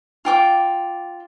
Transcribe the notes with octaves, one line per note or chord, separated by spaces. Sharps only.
F4 G5 D6